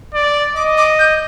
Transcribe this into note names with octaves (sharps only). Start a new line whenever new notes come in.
D5
D#5 D6
D6
G6